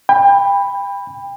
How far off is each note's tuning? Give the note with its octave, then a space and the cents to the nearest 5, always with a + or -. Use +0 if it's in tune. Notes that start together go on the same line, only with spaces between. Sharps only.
G5 +30 B5 +0